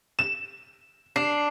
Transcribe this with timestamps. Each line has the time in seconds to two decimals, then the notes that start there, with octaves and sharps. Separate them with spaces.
0.19 E7
1.16 D4 C7